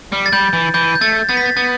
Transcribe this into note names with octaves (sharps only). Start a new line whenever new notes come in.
G3
A6
G3 G6
E3
E3 G6
G6
A3 A6
B3 A6
B6
A6
B3 A6